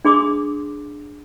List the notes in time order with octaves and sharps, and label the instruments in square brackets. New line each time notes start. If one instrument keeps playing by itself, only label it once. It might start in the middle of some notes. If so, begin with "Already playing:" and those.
[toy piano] D4 G#4 C6 D6 D#6